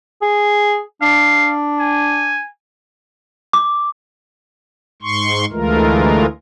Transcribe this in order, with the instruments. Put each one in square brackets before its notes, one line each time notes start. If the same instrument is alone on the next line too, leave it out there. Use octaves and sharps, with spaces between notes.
[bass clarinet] G#4
[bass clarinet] D4 [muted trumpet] F5
[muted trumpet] G#5
[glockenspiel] D6
[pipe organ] G#2 C6 C#6
D2 E3 G#3 A3 F4 A#4